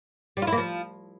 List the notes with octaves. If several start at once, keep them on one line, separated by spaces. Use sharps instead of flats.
G3
F4
E4
A#3
F3